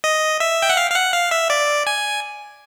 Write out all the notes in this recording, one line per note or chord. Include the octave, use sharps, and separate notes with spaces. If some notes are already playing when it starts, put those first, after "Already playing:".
D#5
E5
G5
F#5
F5
F5
F#5
F5
E5
D5
G#5